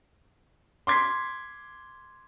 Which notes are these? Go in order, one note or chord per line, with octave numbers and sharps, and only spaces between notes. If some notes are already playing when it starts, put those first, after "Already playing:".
C6 D6 G#6 B6 C7